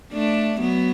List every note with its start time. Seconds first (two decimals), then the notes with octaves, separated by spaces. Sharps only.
0.13 A3 D4
0.60 F#3 B3